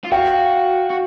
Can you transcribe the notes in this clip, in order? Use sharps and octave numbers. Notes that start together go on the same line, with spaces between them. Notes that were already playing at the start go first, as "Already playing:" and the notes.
F4
F#4 F5 G5
F#4